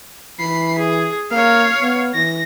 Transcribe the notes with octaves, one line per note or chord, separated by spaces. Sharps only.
E3 B5 C7
G#4
A#3 C#5 F5
B3
E3 A#6